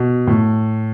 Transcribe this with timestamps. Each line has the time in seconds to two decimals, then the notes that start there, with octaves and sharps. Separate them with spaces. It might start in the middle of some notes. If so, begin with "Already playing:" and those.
Already playing: B2
0.27 A2